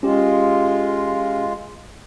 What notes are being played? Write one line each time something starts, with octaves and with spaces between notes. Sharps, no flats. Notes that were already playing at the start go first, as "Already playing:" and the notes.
G#3 C#4 F4 G4